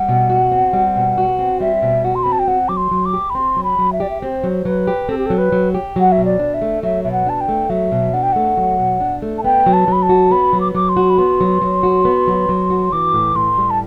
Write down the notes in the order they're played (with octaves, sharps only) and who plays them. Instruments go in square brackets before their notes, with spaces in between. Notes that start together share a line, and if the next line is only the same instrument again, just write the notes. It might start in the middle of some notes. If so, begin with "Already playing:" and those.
Already playing: [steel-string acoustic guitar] G3 [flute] F#5
[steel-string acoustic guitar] B2
F#4
C4
G3
B2
F#4
C4
[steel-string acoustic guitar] G3 [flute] E5
[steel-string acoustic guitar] B2
[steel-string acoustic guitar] F#4 [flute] F#5
[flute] C6
[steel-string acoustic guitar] C4 [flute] B5
[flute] A5
G5
[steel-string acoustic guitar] C4 [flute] F#5
[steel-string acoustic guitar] F#3 [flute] D6
[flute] C6
[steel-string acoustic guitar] F#3
[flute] D6
[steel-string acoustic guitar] G4
[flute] B5
[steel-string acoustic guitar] C4 [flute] C6
[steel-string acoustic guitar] F#3
[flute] B5
[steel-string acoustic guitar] F#3
[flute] E5
[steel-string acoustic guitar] G4 [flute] D5
[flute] E5
[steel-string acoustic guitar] C4 [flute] C5
[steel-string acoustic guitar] F#3
[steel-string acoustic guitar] F#3 [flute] B4
[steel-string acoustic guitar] G4
[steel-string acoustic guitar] C4 [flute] A4
[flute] G4
[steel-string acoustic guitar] F#3 [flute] A4
[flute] B4
[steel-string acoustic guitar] F#3
G4
[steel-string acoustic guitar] F#3 [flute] F#5
[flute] E5
[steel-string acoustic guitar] B2
[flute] D5
[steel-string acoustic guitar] D4
[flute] E5
[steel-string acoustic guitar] A3
[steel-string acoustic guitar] F#3 [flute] E5
[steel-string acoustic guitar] B2 [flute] E5
[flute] F#5
[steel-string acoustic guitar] D4 [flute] A5
[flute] G5
[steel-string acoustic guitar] A3
[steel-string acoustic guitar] F#3 [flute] E5
[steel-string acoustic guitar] B2
[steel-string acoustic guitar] D4 [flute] F#5
[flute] G5
[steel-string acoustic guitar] A3 [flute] F#5
[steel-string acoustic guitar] F#3
B2
D4
A3
[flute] A5
[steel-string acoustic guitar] B3 [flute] G5
[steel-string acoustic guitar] F#3
[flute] A5
[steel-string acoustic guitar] F#3 [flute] B5
[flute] A5
[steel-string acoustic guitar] F#4
[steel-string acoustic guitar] B3 [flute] B5
[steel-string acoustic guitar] F#3
[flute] D6
[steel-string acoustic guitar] F#3 [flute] D6
[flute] C6
[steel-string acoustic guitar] F#4
[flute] B5
[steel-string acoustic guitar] B3 [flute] C6
[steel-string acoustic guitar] F#3
F#3
F#4
B3
F#3
F#3
F#4
[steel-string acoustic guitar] E3 [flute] D6
[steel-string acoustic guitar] A2
[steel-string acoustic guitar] A2 [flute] C6
[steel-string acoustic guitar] G3
[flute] A5